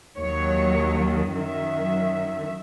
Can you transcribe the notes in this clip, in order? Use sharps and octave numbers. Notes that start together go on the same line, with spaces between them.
D#2 D#3 F#3 C#5
F#2 D#3 F#3 E5